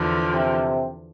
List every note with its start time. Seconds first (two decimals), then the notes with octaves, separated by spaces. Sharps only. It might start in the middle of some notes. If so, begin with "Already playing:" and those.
Already playing: E2 D3 F3
0.33 C3